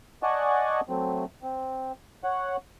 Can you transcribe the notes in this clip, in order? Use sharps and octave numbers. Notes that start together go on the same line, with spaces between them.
D5 D#5 F#5 G#5 A5 C#6
F#3 A3 C4
C4
C#5 F#5